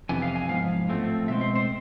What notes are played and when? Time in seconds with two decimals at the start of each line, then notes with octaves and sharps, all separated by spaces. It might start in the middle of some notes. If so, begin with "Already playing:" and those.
0.09 F2 C3 E3 B3 G#5
0.22 F5
0.36 G#5
0.49 G#2 F3 B3 F5
0.88 A2 F3 A3 C4
1.28 B2 G#3 C4 E5
1.41 C5
1.55 C5